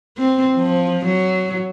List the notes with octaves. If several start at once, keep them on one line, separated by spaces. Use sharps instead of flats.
C4
F3
F#3